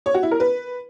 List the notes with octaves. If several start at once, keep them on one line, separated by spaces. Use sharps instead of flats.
C#5
F#4
E4
A#4
B4